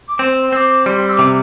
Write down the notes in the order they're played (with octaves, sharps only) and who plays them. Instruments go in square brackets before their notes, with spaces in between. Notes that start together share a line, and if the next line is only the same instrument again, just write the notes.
[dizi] D6
[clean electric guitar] C4 [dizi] C6
[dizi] C6
[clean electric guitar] C4 [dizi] E6
[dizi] D6
[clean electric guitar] G3 [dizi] C6
[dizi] E6
D6
[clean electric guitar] C3